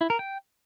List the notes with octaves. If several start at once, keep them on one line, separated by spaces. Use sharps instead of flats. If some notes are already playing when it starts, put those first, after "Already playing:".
E4
A#4
G5